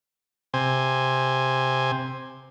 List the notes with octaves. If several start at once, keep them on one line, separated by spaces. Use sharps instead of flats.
C3 C5 G#5